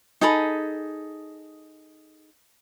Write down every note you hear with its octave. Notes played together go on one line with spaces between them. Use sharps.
D#4 G#4 A4 B5